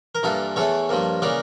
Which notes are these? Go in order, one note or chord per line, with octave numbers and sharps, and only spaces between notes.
A#4
G2 E3 A#3 F4 A4
E2 E3 A3 A4 C#5
G2 F3 A#3
C#3 E3 A#3 A#4 D5